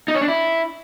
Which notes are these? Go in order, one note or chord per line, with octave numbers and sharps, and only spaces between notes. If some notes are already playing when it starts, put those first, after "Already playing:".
D#4
C#5
D4
E4